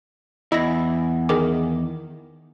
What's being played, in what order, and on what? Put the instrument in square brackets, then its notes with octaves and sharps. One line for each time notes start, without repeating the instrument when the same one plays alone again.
[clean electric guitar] E2 [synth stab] E4 [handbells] D#5 B5 A#6
[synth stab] D#3 [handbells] G#4 A#4 D6